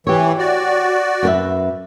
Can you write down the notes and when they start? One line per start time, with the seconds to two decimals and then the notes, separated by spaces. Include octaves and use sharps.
0.07 E3 G4 C#5
0.38 F#4 D5
1.23 F#2 B4 E5